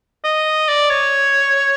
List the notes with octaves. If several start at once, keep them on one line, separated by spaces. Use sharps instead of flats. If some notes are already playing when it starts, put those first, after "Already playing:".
D#5
D5
C#5